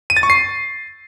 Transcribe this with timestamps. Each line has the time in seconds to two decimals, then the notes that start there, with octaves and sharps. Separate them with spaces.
0.10 D#7
0.17 A6
0.23 C#6
0.30 C7